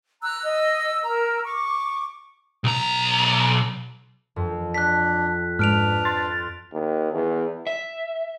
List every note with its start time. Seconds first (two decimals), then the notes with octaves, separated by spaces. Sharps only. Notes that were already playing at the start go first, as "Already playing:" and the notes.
0.22 A#5 E6 F#6
0.44 D#5
1.04 A#4 A#5 E6
1.44 C#6 D6
2.64 B1 A#5
4.36 F2
4.74 D4 F#6 B6
5.59 G#2 D4 B4 F6 D7 F7
6.05 C6 A6
6.73 D#2
7.13 E2
7.67 E5